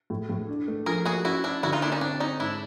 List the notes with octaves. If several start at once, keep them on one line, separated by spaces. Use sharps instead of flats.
A2
A2
D4
A3
F3 G#4 A#4
A#3 F#4 G#4
C#4 E4 F#4
C#4 D4 E4
D3 E4 F#4
D#4 F4
A#3 D4 E4
C#4 D#4
C4 D4
C4 C#4 D#4
G#2 D4 E4